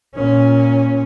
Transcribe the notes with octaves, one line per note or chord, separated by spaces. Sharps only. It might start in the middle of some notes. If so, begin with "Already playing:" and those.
A#2 C#4